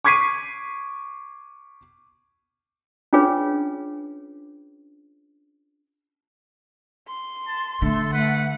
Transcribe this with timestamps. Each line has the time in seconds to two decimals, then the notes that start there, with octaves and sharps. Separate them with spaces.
0.04 C#6 D6 G#6 B6 C7 D#7
3.13 C#4 D4 F4 G#4 B4 C#5
7.07 C6
7.47 A5
7.82 D3 A3 A4
8.13 A3 B4 F#5